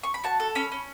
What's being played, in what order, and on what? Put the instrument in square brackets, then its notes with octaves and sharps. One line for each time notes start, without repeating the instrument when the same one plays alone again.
[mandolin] C#6
B5
F#4 A5
A4
C#4 B5
C#4